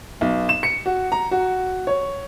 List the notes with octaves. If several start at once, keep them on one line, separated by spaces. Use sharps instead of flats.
B1
E7
C#7
F#4
A#5
F#4
C#5